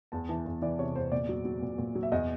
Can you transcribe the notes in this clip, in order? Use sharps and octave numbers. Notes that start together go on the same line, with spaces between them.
E2 A5
E3 A5
E2
E3 D5
C3 C#5
E2 C5
A#2 D5
F#3
F#3
A#2
A#2
F#3
E5
E2 D#5